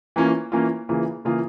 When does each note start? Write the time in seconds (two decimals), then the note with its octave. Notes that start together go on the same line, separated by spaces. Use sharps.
0.16 E3 A#3 C#4 F4
0.52 E3 A#3 C#4 F4
0.89 C#3 E3 A#3 F4 G#4
1.25 C#3 E3 A#3 F4 G#4